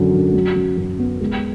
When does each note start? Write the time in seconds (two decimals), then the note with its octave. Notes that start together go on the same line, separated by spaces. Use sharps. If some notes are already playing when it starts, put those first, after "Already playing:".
Already playing: F#2 D3 F#3
0.13 F#2
0.34 F#3
0.56 F#2
0.77 F#2
0.99 B3
1.20 G#3